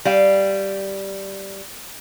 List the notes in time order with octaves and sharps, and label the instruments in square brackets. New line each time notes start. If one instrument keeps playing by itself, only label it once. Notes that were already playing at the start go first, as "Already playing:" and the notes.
[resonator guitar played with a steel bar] G3 F5